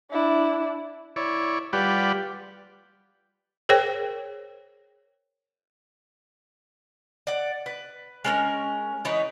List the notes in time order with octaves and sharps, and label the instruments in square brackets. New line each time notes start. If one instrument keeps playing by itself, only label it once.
[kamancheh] D4 E4
[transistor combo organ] E4 C#5 D5
G3 F4 G4 B4 D5 F#5
[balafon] G#4 A#4 C5 C#5 G5
[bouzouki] D5 F#5
B4
G#3 C#4 A#4
E3 B3 D#4 C#5